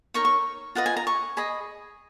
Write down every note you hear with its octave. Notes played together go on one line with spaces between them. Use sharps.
D#4 A#4 C#5 C#6
C#6
F4 B4 D#5 F#5
G#5
A#5
C#6
G#4 D#5 B5